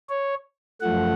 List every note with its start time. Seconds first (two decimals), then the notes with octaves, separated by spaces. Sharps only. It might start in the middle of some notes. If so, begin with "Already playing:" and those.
0.09 C#5
0.81 F#2 F3 A3 F#5